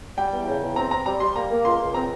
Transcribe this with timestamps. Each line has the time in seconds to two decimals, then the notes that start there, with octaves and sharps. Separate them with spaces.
0.18 G3 G5
0.33 E2
0.47 C#3
0.62 E2
0.76 C4 A#5
0.91 C4 A#5
1.05 G3 A#5
1.20 G3 C6
1.36 A#3 A#5
1.51 A#3
1.65 C#2 C6
1.80 C#2
1.94 C4 A#5